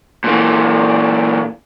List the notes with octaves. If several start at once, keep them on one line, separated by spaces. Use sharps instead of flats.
A#2 E3